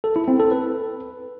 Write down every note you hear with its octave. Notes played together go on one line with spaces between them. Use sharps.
A4
E4
C4
A4
B4